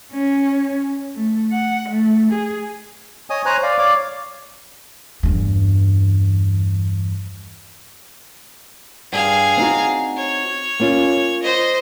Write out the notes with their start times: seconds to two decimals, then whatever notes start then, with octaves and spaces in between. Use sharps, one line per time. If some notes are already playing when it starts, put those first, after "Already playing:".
0.11 C#4
1.16 A3
1.52 F#5
1.89 A3
2.32 G#4
3.30 C#5 D#5 G#5 D#6
3.46 C5 C#5 G#5 A#5 F#6
3.63 D5 F5
3.79 C#5 D5 F5 D6
5.23 E2 G2
9.12 G2 G#4 F5
9.57 C4 D#4 F#4
10.17 C#5
10.80 A#3 C#4 F4
11.42 C5 D#5